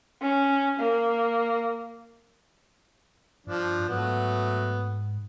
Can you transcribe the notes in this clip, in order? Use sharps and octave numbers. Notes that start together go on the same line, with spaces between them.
C#4
A#3
G2 F3 D4
G#2 F#3 A3 B3